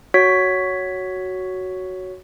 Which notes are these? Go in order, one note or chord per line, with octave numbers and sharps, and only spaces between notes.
F#4 C#5 B6